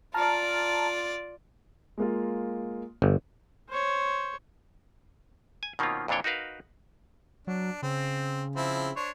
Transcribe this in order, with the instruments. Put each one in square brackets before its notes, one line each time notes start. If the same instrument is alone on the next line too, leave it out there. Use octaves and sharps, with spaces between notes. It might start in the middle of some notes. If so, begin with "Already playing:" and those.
[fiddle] F4 D5 [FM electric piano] A5 A#5 F6
[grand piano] G#3 A#3 F4
[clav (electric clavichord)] G1
[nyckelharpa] C5 C#5
[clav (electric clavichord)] G#5
B2 D#3 A#3 C4 C#4 F4
F2 A#2 E3 D4 C#5 G5
D#4 F#4 A#4 B4 F5
[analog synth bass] F#3 [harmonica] D4
[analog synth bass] C#3 [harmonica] C4
[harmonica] F3 C4 E4
D4 C5 C#5